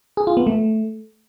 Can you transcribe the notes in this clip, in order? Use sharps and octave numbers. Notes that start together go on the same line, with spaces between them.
G#4
F4
B3
A3